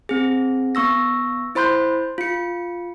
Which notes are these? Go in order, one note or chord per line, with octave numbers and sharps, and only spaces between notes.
C4 G#4
B3 C#6 E6 A#6
E4 C5 B5 C6 G6
F4 C#7